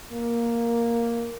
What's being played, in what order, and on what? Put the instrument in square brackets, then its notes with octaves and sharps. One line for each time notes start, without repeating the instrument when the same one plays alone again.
[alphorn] A#3